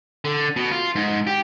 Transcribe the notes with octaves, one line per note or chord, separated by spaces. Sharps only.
D3
B2
F4
G#2
G4